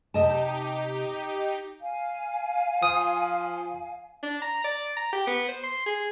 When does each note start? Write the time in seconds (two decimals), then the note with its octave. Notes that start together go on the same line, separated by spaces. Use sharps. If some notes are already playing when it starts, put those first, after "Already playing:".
0.14 C3 D#4 G4 D#5 A5
1.80 F5 G#5
2.83 F3 D#6
4.23 D4
4.42 A#5
4.64 D5
4.96 A#5
5.13 G4
5.27 B3
5.48 C5
5.64 C6
5.86 G#4